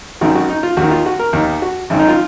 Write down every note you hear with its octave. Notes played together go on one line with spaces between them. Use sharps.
G#1 F#2 D#3 F#4
F#4
D#4
F4
D#2 D#3 F#4
F4
F#4
A#4
D#2 D#3
F#4
G#1 F#2 D#3
D#4
F4